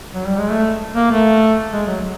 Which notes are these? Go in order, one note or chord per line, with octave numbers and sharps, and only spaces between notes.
F#3
G3
G#3
A3
A#3
A3
G#3
F#3